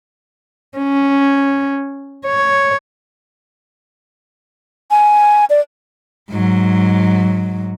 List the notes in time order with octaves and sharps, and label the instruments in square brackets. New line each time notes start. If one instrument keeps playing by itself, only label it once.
[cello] C#4
C#5
[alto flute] G#5
D5
[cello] G#2 F#3